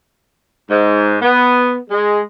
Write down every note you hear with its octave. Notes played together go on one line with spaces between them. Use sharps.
G#2
B3
G#3